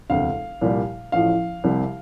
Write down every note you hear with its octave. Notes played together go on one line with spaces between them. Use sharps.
E1 D2 C3 F5
C2 A#2 G3
A1 A2 F3 F5
C2 C3 G3